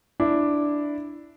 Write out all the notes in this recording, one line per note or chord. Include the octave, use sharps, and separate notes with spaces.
D4 E4